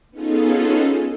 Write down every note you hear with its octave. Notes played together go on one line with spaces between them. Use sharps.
B3 C#4 D#4 F4 G#4 A4